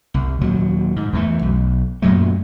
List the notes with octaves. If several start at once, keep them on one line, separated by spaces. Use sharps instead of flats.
C2
D#2 A#2 F#3
G#2
E2 E3 A3
B1
F#2 A#2 F#3 A3